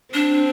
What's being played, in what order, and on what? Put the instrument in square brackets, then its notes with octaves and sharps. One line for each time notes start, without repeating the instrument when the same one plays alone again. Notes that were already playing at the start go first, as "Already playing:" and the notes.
[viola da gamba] C4 [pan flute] D4